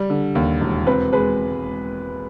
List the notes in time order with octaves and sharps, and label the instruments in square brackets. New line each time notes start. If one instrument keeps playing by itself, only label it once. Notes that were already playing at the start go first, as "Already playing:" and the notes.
Already playing: [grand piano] G3
D3
D#2
E1
[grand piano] C4 [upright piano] B4
[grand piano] G#3 [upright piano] B4